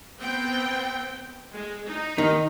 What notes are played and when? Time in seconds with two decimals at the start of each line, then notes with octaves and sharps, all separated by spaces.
0.21 B3 C4 G5
1.53 G#3
1.89 D#4
2.18 D#3